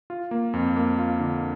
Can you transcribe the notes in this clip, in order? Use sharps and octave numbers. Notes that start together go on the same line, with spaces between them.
F4
A#3
F2
A#3
F4
D3